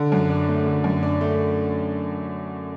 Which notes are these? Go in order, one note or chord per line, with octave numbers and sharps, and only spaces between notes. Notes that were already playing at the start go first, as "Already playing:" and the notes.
Already playing: D3
F#2
D4
A3
D3
F#2
D4
A3